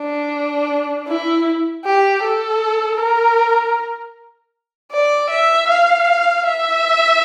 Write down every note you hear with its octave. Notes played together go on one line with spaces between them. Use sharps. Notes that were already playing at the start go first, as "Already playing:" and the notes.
Already playing: D4
E4
G4
A4
A#4
D5
E5
F5
E5